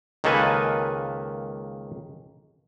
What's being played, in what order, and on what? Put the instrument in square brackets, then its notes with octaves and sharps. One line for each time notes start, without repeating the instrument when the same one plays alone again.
[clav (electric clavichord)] C#2 D#3 A#3 A4 B4 G#5